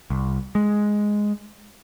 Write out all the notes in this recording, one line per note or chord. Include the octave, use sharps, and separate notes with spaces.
C2
G#3